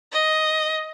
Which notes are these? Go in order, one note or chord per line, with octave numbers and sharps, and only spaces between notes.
D#5